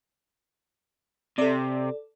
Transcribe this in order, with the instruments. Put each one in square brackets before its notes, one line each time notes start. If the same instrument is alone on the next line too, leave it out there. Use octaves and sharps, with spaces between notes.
[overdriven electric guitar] C3 [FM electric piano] A4 D5